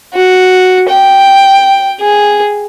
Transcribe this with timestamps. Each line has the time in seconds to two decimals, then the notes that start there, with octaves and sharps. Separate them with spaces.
0.14 F#4
0.88 G5
2.00 G#4